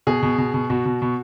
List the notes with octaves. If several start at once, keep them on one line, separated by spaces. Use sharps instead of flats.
B2 G#4
B2
B2
B2
B2 F#4
B2
B2